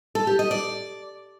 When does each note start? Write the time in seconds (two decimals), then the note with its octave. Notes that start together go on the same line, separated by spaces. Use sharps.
0.15 A4
0.27 G4
0.39 D#5
0.51 D5